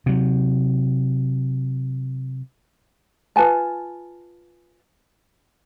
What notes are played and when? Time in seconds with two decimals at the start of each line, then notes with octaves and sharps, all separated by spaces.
0.06 C3 F#3
3.36 F4 B4 G#5 A5